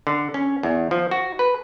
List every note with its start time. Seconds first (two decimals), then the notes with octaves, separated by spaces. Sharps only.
0.07 D3
0.34 C#4
0.63 E2
0.91 F3
1.11 F#4
1.39 B4